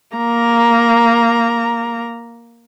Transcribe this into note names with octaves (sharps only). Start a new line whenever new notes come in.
A#3 A#5